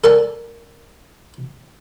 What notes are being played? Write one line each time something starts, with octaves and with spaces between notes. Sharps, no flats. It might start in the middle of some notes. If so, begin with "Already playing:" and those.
A4 A#4 D5 G#5 A5